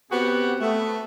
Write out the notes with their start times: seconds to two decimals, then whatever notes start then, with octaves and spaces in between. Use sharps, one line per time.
0.12 B2 B3 C4 F#4 G4 F#5
0.61 A3 B3